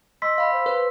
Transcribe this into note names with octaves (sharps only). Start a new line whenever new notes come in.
D#5 C6 E6 B6
F5 B5
C5
B4